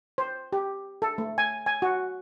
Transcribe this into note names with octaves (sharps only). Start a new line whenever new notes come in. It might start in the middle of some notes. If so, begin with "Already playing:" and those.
C5
G4
A4
A3
G#5
G#5
F#4